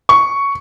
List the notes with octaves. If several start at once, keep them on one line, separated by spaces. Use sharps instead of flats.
C#6